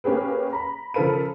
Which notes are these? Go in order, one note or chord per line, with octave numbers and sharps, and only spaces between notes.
A#3 C#4 G4 G#4 B4
A#5 B5
C#3 F3 A4 A#4 B5 D#7